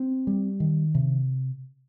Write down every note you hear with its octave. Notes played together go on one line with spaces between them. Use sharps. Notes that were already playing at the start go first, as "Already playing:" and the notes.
Already playing: C4
G3
D#3
C3